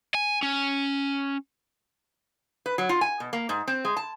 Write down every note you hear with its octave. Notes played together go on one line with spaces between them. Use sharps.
G#5
C#4
B4
F#3
F4
G#5
B2
A#3
G#2
C4
G#3
A5